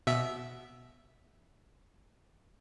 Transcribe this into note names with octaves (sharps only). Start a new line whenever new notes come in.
B2 E5